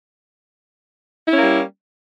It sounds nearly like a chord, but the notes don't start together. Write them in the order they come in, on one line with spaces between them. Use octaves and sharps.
E4 C#4 A#3 G3